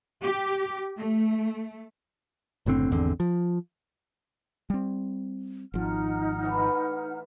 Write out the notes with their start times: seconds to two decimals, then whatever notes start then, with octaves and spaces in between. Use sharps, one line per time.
0.20 G4
0.97 A3
2.66 F#1 A2 D3 C4
2.91 G#1 E2 D3 C4
3.20 F3
4.70 G3 C4
5.74 G#1 F3 D#4 F#5 F6
6.43 A2 E3